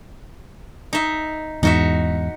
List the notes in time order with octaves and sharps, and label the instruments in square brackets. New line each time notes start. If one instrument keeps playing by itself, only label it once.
[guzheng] D#4 E5
[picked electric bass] E2 G#2 [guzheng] D#4 F#4 E5